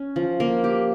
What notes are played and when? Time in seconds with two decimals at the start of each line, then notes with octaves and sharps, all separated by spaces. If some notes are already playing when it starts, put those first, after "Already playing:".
Already playing: C#4
0.16 F3
0.40 A#3
0.64 G4